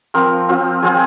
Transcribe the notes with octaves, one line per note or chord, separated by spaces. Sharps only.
F3 C4 F4 A#4
F3 C4 F4
F3 C4 F4 G#4